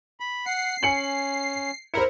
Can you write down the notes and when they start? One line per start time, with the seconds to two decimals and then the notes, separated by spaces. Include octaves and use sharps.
0.20 B5
0.46 F#5 C7
0.83 C#4 G#5 C#7 F#7
1.94 E4 A#4 C5 C#7